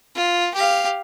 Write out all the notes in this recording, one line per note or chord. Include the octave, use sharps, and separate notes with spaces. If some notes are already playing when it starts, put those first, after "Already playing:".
F4
G4 F5